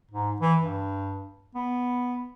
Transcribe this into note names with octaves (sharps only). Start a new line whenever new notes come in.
G#2
E3
G2
B3